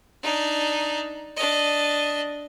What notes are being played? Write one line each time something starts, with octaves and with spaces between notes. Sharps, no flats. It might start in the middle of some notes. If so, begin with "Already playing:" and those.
D4 D#4
D4 D#5